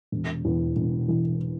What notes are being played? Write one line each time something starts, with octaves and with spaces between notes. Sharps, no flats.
E1
E2
E1
E3